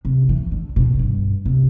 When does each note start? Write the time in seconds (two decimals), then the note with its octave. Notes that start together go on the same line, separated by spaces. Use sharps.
0.05 C3
0.29 E3
0.52 D3
0.76 B2
0.99 G2
1.46 C3